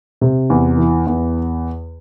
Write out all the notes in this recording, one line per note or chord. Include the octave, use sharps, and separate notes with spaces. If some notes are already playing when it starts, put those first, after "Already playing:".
C3
E2
E3
E2